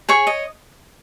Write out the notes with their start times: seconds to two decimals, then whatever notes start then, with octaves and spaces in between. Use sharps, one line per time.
0.09 G#4 C#5 C#6
0.27 D#5